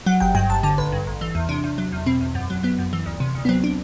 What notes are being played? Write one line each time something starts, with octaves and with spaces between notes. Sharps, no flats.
F#3 F#5
G1 G5
G2 G5
G1 A5
D3 A5
A1 B4
G2
A1
E3
E2
C3 D4
E2
F#3
E2
B2 C4
E2
F#2
F#3
F#3 B3
F#2
E3
D2
C3
D2
B3
F#3 C4
D4